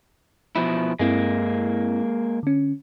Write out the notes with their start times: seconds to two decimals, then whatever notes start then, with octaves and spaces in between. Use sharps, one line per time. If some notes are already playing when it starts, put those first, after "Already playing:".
0.56 B2 F3 E4
0.99 G2 G#3 A#3 C4 E4
2.43 D3 C#4